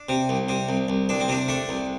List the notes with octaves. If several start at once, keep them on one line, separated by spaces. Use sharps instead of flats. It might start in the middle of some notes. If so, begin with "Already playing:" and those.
Already playing: D4
C3
C2
C3
C2
C2
C2 D4
C4
C3 D4
A3 D4
C2